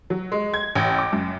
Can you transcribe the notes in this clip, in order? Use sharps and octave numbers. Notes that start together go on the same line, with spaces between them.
F#3
G#3
G#6
A1
D6
F#2